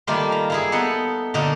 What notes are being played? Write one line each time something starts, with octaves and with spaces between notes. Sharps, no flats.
D#3 G3 A3 A#3 F4 G4
A#5
A#3 E4 G#4
B3 D#4 A4 F#5
A#2 D3 A#3 D#4 A4